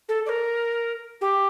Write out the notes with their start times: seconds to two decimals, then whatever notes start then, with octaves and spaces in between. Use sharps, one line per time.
0.08 A4
0.25 D5
0.29 A#4
1.21 G4